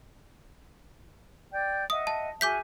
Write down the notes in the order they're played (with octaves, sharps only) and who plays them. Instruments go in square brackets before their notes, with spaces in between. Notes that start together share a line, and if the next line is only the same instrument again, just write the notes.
[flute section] D5 G5 G6
[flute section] D#5 E5 F#5 [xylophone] D#6
[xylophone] A5
[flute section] F#4 G#4 E5 [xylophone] D6 G6 B6